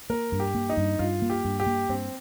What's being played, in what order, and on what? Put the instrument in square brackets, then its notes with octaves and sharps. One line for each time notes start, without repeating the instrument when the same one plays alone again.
[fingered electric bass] A#3 [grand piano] A#4
[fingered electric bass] G2
[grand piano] G4
[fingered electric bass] A#3
[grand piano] D#4
[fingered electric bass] G2
[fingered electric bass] G2 [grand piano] F4
[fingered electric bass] A#3
[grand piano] G4
[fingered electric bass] G2
[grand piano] G4
[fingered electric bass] A#3
[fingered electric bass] G2 [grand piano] C4